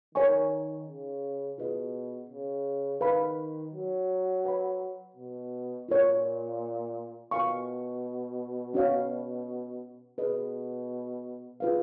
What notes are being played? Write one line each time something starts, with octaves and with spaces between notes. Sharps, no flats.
D#3 A#4 C#5 G#5 C#6
C#3
B2 F4 G#4 B4 D#5
C#3
D#3 B4 F5 B5
F#3
B4 F#5 B5
B2
A#2 F4 A#4 C#5
B2 F4 A#4 F5 G#5 C#6
C#4 F#4 C#5 F5
B2 G#4 B4 D#5
F4 G#4 B4 F5